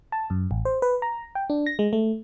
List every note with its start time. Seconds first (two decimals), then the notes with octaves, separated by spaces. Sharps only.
0.12 A5
0.30 F#2
0.51 A1
0.65 C5
0.82 B4
1.02 A#5
1.35 G5
1.50 D4
1.66 A#6
1.79 G#3
1.93 A3